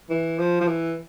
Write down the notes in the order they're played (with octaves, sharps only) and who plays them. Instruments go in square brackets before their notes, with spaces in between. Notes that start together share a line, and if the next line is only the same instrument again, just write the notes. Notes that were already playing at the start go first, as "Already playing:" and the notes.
[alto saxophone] E3
F3
F3
E3